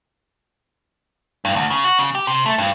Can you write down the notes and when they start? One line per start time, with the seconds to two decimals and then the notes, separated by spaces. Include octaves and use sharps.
1.45 G2
1.56 D2
1.70 C#3
1.84 F#4
1.98 C#3
2.15 G4
2.27 C3
2.46 A3
2.58 G2